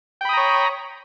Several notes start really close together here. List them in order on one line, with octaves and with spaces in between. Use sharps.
G5 B5 D#6 A#5 C#5